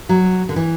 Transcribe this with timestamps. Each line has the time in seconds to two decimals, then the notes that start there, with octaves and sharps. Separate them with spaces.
0.09 F#3
0.49 D3
0.56 E3